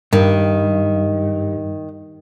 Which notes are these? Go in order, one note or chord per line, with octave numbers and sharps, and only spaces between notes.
G2 D#3